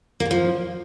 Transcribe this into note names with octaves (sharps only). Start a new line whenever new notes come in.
A#3
G#2
F3